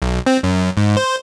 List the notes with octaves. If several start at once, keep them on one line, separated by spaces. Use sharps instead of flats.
B1
C4
F#2
G#2
C5